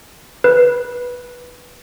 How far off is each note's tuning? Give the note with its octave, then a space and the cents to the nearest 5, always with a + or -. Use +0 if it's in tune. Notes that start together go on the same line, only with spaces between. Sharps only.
B4 -10